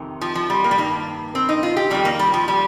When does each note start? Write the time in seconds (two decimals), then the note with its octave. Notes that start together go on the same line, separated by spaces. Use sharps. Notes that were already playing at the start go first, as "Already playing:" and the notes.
Already playing: F2 C3 D#3
0.21 F3
0.35 F3
0.50 G3
0.64 A#3
0.71 G3
0.78 G2 D#3 A#3
1.35 C4
1.49 D#4
1.63 F4
1.77 G4
1.90 F2 D#3 G3
2.05 A#3
2.19 G3
2.34 F3
2.48 G3